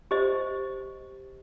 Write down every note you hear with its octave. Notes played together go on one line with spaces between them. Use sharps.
G4 C5 D#5